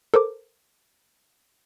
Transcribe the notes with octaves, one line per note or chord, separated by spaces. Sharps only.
A4 A#4 C5 D6